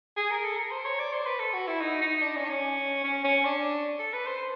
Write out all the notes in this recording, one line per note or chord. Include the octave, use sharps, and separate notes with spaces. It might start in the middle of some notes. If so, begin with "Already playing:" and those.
G#4
A#4
A4
A#4
C5
C#5
D5
C5
B4
A4
F#4
E4
D#4
D#4
D4
C#4
D4
C#4
C#4
C#4
D4
A4
B4
C5